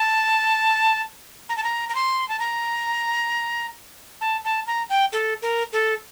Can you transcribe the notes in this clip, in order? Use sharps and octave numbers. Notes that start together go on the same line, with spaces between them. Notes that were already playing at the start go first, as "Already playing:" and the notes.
Already playing: A5
A#5
A5
A#5
A#5
C6
A5
A#5
A5
A5
A#5
G5
A4
A#4
A4